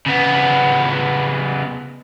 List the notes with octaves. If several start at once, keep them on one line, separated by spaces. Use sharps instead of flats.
C#3 B3